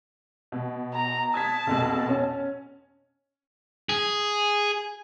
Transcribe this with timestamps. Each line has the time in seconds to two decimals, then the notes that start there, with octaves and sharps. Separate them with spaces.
0.52 B2
0.94 A#5
1.34 A5 D#6 G#6 B6
1.67 A#1 F2 B2
2.09 C#4
3.89 G#4